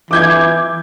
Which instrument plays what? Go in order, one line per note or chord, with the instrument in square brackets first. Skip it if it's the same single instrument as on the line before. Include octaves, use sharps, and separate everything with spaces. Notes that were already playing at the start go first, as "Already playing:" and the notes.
[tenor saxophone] E3 [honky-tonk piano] D6 G6 G#6